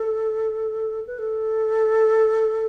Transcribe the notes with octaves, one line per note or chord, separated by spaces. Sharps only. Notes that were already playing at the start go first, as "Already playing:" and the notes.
Already playing: A4
B4
A4